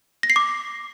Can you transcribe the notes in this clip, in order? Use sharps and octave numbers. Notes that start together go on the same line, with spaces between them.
A#6
C7
D6